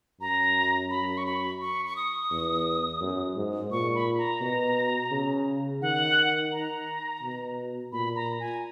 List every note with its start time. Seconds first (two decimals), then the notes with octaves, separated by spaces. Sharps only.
0.20 F#2 A#5
0.90 B5
1.17 C#6
1.26 B5
1.61 C#6
1.86 C#6
1.96 D#6
2.31 E2
3.01 F#2
3.36 G#2
3.71 A#2 C#6
3.95 B5
4.18 A#5
4.41 B2
5.11 C#3
5.82 D#3 F#5
6.52 A#5
7.23 B2
7.92 A#2 B5
8.16 A#5
8.40 G#5